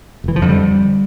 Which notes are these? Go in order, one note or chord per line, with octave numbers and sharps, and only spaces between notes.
F1 E3
F3
F2 D3
G3